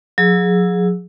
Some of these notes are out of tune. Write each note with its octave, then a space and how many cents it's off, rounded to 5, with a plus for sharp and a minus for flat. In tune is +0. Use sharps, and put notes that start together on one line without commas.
F#3 -45 G#4 +0 E6 +0